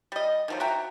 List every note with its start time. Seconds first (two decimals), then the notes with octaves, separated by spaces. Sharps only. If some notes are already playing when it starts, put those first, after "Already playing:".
0.12 G3 D#5
0.48 D#3 F3 F#3
0.60 F#4 E5 G5 A#5